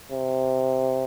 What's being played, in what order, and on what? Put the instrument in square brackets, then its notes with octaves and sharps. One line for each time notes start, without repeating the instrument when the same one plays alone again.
[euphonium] C3